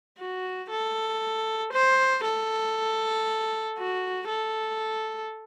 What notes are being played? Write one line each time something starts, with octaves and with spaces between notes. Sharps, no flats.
F#4
A4
C5
A4
F#4
A4